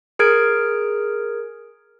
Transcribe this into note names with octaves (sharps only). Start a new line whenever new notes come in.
G#4 A#4 F6 G#6 D7